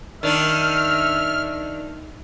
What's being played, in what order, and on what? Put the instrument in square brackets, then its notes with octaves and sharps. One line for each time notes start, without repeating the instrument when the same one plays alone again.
[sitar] D#3 D4 [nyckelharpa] E5 [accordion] F6